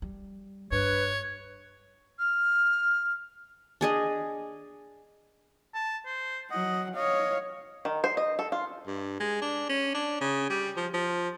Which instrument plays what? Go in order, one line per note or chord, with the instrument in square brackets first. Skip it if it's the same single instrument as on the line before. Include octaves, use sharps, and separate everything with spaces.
[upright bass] G3
[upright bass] G2 [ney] B4 [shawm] C#5
[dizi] F6
[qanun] D4 G#4 D#5
[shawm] A5
C5
[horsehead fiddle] F#3 F#5 [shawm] D#5
[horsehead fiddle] C#5 F5 [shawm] D#5
[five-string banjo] D#3
C5
D#5
A4
F4
[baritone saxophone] G2
G#3
D4
C#4
D4
C#3
G3
F3
F3